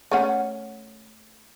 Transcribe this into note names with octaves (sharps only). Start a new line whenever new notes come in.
A3 C#4 F#5